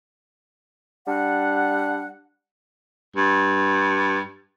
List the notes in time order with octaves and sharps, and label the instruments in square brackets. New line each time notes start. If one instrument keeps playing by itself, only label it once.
[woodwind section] G3 D4 F#5
[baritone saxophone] G2